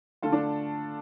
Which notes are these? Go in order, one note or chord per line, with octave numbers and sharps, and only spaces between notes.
D3 A3 F4 A4
D4